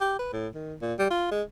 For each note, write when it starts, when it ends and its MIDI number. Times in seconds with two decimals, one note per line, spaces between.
0.01 0.17 67
0.19 0.30 71
0.33 0.48 45
0.55 0.74 51
0.82 0.94 46
0.99 1.09 55
1.10 1.29 65
1.31 1.42 56